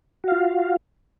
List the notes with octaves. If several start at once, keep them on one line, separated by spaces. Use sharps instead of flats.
F4 F#4 F5